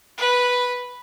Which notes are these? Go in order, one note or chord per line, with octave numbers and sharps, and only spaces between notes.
B4